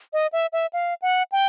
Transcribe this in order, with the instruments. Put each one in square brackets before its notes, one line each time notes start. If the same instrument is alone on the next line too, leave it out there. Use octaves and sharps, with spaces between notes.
[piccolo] D#5
E5
E5
F5
F#5
G5